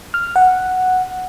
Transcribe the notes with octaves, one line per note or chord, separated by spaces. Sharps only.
F6
F#5